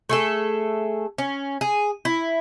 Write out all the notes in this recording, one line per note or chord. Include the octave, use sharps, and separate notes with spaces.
A3 G#4 A4
C#4
G#4
E4